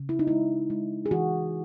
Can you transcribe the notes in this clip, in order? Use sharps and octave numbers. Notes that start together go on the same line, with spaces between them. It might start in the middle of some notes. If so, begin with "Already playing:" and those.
Already playing: C#3
E4
D#4
G#3 E4
G#3
G#4
E3 F#4